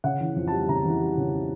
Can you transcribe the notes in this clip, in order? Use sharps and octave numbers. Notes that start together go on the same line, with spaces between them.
C#3 F#5
E3
F2
G3 A5
C#3 A#5
E3
G3
C#3